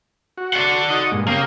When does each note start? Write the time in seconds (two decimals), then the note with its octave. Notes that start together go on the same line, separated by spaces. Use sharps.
0.38 F#4
0.53 D5 F#5
0.90 D#4 F#4 D#6
1.12 G2 A#2 G#3
1.28 C#3 A#3 G4 D#6